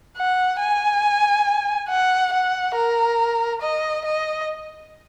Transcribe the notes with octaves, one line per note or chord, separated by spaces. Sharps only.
F#5
G#5
F#5
F#5
A#4
D#5
D#5